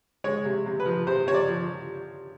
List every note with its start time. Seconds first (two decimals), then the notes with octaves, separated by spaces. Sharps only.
0.24 G#3 C#5
0.45 C3
0.66 C3
0.80 B4
0.86 F3
1.07 C3 C5
1.26 C3 C#5
1.34 D5
1.48 F3